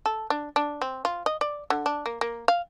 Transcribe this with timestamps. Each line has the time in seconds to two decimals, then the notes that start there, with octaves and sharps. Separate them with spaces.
0.06 A4
0.30 D4
0.56 D4
0.81 C4
1.05 F4
1.26 D#5
1.41 D5
1.70 D3
1.86 D4
2.06 A#3
2.21 A#3
2.48 F5